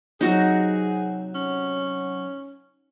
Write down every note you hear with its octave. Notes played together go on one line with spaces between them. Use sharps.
C3 F#3 D#4 F#4 G#4
C#4